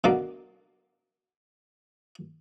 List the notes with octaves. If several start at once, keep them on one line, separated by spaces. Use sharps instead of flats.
B2 D3 A#3